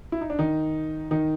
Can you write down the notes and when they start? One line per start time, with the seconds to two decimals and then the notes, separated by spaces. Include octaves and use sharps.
0.12 E4
0.21 D#4
0.30 D4
0.39 D#3 D#4
1.11 D#3 D#4